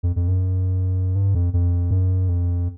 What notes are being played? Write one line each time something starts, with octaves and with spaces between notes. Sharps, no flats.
F2
F2
F#2
G2
F2
F2
F#2
F2